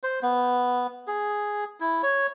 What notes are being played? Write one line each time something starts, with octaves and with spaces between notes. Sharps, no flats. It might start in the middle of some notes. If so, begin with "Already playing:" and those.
C5
B3
G#4
E4
C#5